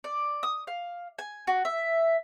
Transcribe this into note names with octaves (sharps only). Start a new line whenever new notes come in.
D5
D#6
F5
G#5
F#4
E5